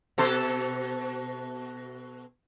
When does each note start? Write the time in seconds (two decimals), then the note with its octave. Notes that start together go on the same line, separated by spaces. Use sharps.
0.18 B2 A4 C5